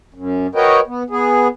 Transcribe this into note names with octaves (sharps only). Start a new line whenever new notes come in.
F#2
F#4 A#4 B4 C#5 D#5 G5
B3
B3 G#4